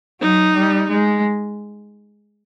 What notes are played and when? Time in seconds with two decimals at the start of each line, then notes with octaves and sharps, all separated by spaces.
0.21 F#3 D#4
0.55 G3
0.90 G#3